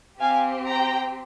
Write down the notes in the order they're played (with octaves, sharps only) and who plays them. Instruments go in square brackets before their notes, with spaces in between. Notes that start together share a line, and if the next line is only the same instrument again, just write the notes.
[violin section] C4 G4 F5 G#5
G5 A#5